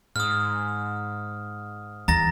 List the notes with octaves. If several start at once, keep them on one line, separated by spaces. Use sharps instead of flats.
G#2 D#6 F6
E2 A#5 A6 A#6